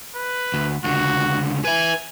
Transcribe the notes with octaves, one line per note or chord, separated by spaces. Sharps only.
B4
D2
C#2 D3 F#4
B4 E5 G#5